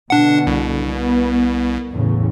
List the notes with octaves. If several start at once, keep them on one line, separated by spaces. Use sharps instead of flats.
B2 D3 D4 F#5
C2
B3
E2 A2 C#3